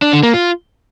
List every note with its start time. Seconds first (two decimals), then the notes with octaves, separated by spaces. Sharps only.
0.02 D4
0.13 D3
0.23 A#3
0.34 F4